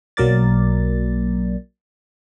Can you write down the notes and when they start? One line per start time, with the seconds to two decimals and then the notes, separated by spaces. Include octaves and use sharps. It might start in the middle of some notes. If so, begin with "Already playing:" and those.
0.17 B1 F#3 A#3 A#4 D5 A6